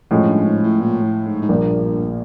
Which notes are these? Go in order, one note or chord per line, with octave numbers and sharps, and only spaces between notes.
F#2 A2 F3 G#3 C#4
G2
G#2
A2
A#2
A2
G#2
G#2
A#1 G2 A#2 F3 A#3